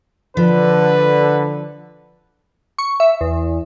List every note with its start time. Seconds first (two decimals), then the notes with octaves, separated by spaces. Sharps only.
0.37 D3 F3 B4
2.78 C#6
3.00 E5
3.21 E2